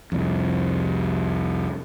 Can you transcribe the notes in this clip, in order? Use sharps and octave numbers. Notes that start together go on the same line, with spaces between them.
C2 F2